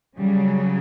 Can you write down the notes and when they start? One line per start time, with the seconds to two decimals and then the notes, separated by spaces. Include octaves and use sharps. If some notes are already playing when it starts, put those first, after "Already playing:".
0.20 C#3 F#3 G3